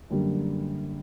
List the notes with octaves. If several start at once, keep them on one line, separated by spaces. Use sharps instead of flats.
F#2 D3 G3 A#3